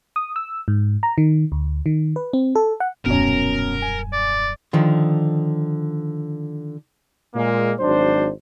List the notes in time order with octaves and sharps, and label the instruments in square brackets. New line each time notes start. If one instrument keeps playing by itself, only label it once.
[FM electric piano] D#6
E6
G#2
A#5
D#3
D2
D#3
B4
C4
A4
F#5
[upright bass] D#1 F#2 [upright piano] B2 C#4 [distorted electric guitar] A#4
[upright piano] G#5
[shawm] D5
[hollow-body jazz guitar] D3 D#3 F3
[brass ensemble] A#2 G#3 A#3
G#1 F#3 D4 C5